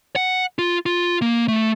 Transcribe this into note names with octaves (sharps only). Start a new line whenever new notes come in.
F#5
F4
F4
A#3
A3